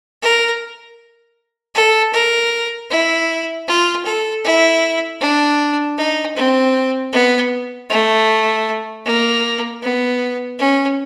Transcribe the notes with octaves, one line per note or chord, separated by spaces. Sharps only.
A#4
A4
A#4
E4
F4
A4
E4
D4
D#4
C4
B3
A3
A#3
B3
C#4